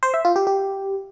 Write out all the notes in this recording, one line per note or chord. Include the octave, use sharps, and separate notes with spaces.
C5
E5
F4
G4
G4